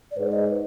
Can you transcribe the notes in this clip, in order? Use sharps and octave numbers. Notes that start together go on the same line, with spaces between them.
D5
G#2 B4
D5
D#5
B4